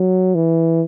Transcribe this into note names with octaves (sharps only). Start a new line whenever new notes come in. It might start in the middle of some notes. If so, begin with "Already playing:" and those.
Already playing: F#3
E3